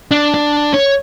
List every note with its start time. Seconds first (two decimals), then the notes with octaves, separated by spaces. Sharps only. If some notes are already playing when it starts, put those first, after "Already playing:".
0.11 D4
0.34 D4
0.74 C#5